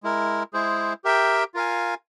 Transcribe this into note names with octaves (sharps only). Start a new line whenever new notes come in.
G#3 E4 A#4
G#3 E4 G#4 C5
G4 A#4 E5 G5
F4 A#4 F5 G#5